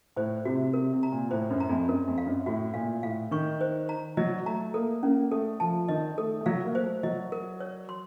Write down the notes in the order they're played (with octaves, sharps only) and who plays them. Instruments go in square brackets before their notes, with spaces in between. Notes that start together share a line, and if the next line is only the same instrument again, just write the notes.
[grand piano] A2 [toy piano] C5
[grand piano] C3 [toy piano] F#4
[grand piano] C3 [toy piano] A#4
[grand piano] C3
[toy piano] A#5
[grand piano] A#2
[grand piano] A2 [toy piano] C5
[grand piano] F#2
[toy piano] A#5
[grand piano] F2
[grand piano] F#2 [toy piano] A#4
[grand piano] F2
[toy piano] F5
[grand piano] F#2
[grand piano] A2 [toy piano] F#4
[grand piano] A#2 [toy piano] F5
[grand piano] A2 [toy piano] F5
[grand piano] D#3 [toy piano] C#6
[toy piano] C5
A#5
[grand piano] F#3 [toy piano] D#5
[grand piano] A3 [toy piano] A#5
[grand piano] A#3 [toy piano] A4
[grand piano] A#3 [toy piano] C#4
[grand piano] A3 [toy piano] A4
[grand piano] F3 [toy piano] A5
[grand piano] D#3 [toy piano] D#5
[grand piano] A3 [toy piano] A4
[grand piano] A3
[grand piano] F#3 [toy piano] F5
[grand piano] A#3
[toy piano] C5
[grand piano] A3
[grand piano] F#3 [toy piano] D#5
[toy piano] A#4
C#5
C6